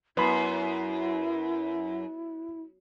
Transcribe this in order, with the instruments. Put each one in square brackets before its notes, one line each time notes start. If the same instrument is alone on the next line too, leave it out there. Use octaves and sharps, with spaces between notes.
[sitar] F#2 [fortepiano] B3 B5 [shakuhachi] E4